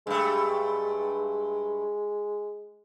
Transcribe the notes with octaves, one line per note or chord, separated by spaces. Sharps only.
G2 G#3 A3